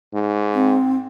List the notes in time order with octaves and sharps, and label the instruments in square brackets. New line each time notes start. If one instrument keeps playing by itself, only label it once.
[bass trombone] G#2
[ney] C4